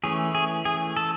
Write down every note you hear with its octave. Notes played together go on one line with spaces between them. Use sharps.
E3 A3 C#4 G#4
G#4
G#4
A4